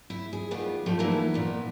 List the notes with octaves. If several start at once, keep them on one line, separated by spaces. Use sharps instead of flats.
E4
G#4
D#3 G3 B3 F4 G4
A2 F3 G3 A3 G4
E3 A#3 B3 D#4 E4 C#5
A#2 B3